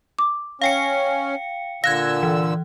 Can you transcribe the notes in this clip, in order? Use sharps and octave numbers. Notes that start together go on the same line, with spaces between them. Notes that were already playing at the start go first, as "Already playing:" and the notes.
D6
C#4 F5 G5 C#7
A#2 D3 F5 E6 F#6 G#6 A#6
E3